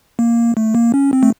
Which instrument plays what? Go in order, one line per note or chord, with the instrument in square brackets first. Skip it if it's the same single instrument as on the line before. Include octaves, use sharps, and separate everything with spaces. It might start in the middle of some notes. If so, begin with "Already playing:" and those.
[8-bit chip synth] A#3
A3
A#3
C#4
C4
A3